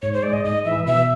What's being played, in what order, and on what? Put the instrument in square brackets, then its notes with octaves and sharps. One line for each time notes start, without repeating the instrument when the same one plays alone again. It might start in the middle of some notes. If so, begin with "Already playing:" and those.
[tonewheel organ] G#2 [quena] C#5
[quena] C5
[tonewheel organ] G#3 [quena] D5
[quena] D#5
[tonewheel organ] G#2 [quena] D#5
[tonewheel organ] E3 [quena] E5
[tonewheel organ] B2 [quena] E5